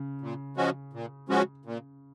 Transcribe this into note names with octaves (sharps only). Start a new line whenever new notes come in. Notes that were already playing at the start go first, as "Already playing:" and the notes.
Already playing: C#3
A#2
F3 G#3 C#4 F#4
A#2
F3 G#3 C#4 F#4
A#2